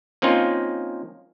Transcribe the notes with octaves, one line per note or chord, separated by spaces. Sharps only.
F3 A#3 C4 C#4 D#4 F4